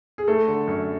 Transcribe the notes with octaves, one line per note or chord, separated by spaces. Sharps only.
G#4
A3 A4
D3
F#2